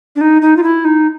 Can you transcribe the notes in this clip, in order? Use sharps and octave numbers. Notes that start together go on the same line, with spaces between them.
D4
D#4
D#4
F4
E4
D#4